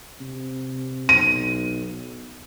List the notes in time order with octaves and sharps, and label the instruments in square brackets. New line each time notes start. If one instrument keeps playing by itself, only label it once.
[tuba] C3
[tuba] B1 [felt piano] D#7